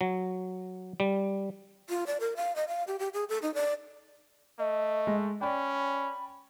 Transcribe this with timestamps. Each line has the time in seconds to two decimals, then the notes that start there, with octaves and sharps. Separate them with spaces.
0.01 F#3
1.00 G3
1.89 F4
2.07 D5
2.20 A#4
2.36 F5
2.56 D#5
2.68 F5
2.87 G4
2.99 G4
3.14 G#4
3.29 A4
3.42 D#4
3.54 D5
4.59 A3 D#5
5.07 G#3
5.41 C#4 D5 G5 B5